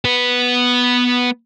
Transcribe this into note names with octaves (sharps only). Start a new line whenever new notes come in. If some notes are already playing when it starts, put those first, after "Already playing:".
B3 B4